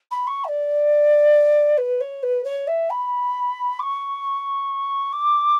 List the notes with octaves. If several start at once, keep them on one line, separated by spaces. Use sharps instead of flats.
B5
C#6
E5
D5
B4
C#5
B4
C#5
E5
B5
D6
C#6
D6